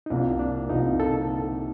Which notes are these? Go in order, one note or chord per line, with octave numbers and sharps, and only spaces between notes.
D#4
C2 C3 F3 A#3 D4
D4
C2 C3 F3 A#3 D#4
A4